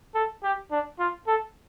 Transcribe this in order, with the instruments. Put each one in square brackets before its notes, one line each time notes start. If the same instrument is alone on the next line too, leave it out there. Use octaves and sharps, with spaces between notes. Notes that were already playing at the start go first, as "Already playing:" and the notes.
[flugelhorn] A4
G4
D4
F4
A4